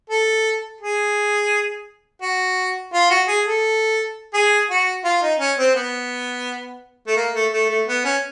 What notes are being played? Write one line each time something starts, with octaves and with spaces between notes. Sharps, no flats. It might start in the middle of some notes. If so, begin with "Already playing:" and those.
A4
G#4
F#4
F4
F#4
G#4
A4
G#4
F#4
F4
D#4
C#4
C4
B3
A3
A#3
A3
A3
A3
B3
C#4